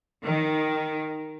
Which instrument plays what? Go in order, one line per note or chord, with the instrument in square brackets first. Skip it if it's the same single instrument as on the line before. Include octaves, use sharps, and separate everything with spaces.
[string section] D#3